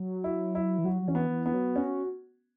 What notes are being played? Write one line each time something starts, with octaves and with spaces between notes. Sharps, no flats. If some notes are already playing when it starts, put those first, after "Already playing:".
Already playing: F#3
E4
E4
E3
F#3 F#4
F#3
E3 C#4
B3
E3
B3
F#3
C#4 F#4